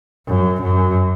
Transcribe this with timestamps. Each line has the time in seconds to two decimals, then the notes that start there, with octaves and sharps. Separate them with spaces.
0.27 F#2
0.63 F#2